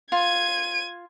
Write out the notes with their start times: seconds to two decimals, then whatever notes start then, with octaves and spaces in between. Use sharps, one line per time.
0.12 F4 G#6 D#7